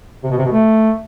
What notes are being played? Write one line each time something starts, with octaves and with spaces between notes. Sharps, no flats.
C3
B2
C3
B2
A3